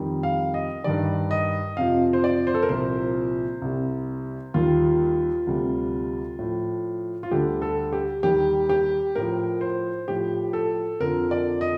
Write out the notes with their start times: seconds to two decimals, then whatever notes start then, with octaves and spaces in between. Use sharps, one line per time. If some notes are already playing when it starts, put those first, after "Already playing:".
Already playing: F2 D#3 G3
0.23 F5
0.54 D#5
0.84 G2 D#3 G3 D5
1.31 D#5
1.77 F2 C3 F3 F5
2.13 C5
2.24 D5
2.47 C5
2.54 A4
2.62 A#4
2.69 C2 A#2 F3 C5
3.62 C2 C3 G3
4.54 D#2 D#3 G3 F4
5.47 D2 C3 G3
6.39 A2 F3
7.23 F4
7.31 D2 D3 G3 G4
7.62 A4
7.93 G4
8.23 D#2 D#3 G3 G4
8.69 G4
9.15 A2 F3 A#4
9.61 C5
10.08 A2 F3 G4
10.53 A4
11.00 F2 D3 F3 A#4
11.31 D5
11.61 D#5